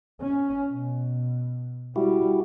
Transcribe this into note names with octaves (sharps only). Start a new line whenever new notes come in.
C#4
B2
G3 E4 F#4 G4